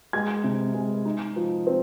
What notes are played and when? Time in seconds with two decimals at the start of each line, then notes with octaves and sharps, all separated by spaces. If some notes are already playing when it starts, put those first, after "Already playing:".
0.13 G#3 G#6
0.44 C3
0.74 G#3
1.05 D#4
1.36 F3
1.67 C4